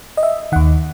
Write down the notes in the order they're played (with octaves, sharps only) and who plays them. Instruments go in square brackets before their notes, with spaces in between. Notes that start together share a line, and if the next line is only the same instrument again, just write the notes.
[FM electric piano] D#5
E5
D#2 D#3 F#5